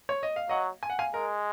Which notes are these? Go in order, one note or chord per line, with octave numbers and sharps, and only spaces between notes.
C#5
D#5
F5
F#3 D#5 F#5
G#5
F#5
F5 G#5
G#3 A#4